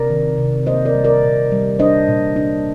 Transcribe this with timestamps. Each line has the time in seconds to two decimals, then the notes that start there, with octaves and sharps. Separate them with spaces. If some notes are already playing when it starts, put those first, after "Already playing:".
Already playing: C3 A#4 D5
0.10 D#3
0.38 C3
0.66 A#3 C5 D#5
0.85 A#4 D5
0.95 G3
1.04 A#4 D5
1.23 A#2
1.52 G3
1.79 D4 C5 D#5
2.08 A#2
2.36 D4